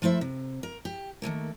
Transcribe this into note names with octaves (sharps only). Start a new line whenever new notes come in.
F3 A3 E4 C5 E5
C3
A#4
G4
D#3 F3 A3 A#3